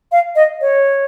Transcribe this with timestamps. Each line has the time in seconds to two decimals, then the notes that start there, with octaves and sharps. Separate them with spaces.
0.12 F5
0.36 D#5
0.61 C#5